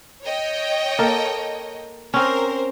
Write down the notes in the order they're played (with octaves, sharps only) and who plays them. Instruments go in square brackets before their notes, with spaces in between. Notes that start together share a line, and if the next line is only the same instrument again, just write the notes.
[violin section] C#5 D#5 G5
[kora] A#3 A4 A#4
[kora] C4 C#4 [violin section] A#4 C5